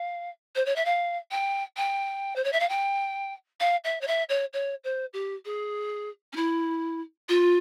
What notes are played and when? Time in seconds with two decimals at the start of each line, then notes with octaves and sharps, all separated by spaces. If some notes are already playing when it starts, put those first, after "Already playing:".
Already playing: F5
0.56 C5
0.66 C#5
0.76 E5
0.85 F5
1.31 G5
1.77 G5
2.36 C5
2.44 C#5
2.53 E5
2.60 F5
2.69 G5
3.60 F5
3.84 E5
4.01 C#5
4.07 E5
4.29 C#5
4.53 C#5
4.84 C5
5.13 G4
5.45 G#4
6.33 C#4
6.36 E4
7.29 F4